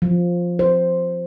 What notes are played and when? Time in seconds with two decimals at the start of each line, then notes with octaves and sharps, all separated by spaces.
0.02 F3
0.59 C5